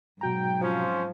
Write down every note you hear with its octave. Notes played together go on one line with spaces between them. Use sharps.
G#2 B2 F#3 F#4 G5 A#5
F3 C4 C#4 C5